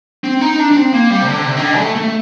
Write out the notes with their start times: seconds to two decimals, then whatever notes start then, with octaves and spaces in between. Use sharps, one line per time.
0.24 C4
0.41 D#4
0.60 D4
0.71 D4
0.76 C4
0.93 A#3
1.10 G3
1.22 C3
1.28 D3
1.45 C3
1.57 D#3
1.62 D3
1.79 A3
1.96 A3